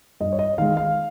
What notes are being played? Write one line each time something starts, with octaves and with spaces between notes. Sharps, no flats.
G2 D#5
C#5
D#5
D#3 G#3 F5
F5